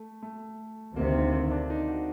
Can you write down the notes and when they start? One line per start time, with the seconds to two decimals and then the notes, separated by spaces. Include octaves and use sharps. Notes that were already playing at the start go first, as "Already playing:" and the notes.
Already playing: A3
0.22 A3
0.96 D2 C3 D#3 A#3
1.15 A#3
1.33 C4
1.51 D4
1.70 D#4
1.88 F#4